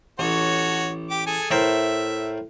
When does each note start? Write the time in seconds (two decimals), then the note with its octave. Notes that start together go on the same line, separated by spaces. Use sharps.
0.19 A1 F#4 A4 C#5
1.11 G4 D6
1.27 G#4 A4 G#5
1.51 A2 A#4 C5 E5